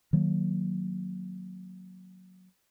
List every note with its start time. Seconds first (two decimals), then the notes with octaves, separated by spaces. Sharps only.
0.13 D#3 F#3 A#3